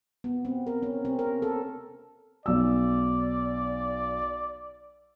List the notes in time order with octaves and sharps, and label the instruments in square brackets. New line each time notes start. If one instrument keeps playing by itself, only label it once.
[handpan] B3
C4
A#4
C#4
C4
A#4
A4
[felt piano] B1 E6 [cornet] D5